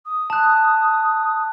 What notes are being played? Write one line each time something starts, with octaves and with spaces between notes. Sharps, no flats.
D#6
A5 F#6